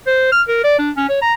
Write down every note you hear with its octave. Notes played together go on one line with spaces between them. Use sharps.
C5
F6
A#4
D5
D4
C#4
C#5
A#5